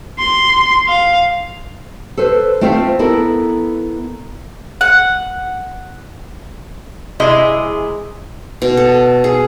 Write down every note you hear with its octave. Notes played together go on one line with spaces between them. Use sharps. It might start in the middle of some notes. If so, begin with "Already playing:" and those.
C6
F5
A4 B4 C5
A3 C4 F4 C5 E5 F5
B3 E4 A4 A#4
F#5
C3 G#3 E4 G#4 D#5
B2
A4
G#4